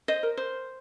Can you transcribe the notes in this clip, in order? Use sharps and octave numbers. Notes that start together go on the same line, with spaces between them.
C5 D#5
A#4
C5